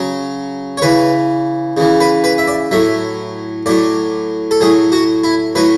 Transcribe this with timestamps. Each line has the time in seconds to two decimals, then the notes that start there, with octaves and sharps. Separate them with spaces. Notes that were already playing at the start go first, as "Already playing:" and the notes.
Already playing: C#3 F#3
0.77 C#5
0.82 C#3 E3 B4
1.77 C#3 E3
2.00 B4
2.24 B4
2.38 E5
2.47 D5
2.71 A2 F#3 E5
3.66 A2 F#3 D5
4.51 A4
4.61 A2 F#3 G#4
4.92 F#4
5.24 E4
5.55 A2 F#3 B4